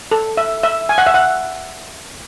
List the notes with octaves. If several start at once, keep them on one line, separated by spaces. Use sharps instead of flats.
A4
E5
E5
G#5
F#5
E5
F#5